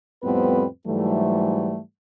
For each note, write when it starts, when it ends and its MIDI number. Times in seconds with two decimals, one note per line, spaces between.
0.23 0.65 41
0.23 0.65 45
0.23 0.65 55
0.23 0.65 59
0.23 0.65 60
0.23 0.65 71
0.86 1.79 44
0.86 1.79 52
0.86 1.79 54
0.86 1.79 55
0.86 1.79 57